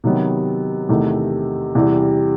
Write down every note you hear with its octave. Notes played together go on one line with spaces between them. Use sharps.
C3 D#3 F#3 B3
E2 C3 D#3 A3
E2 C3 E3 G3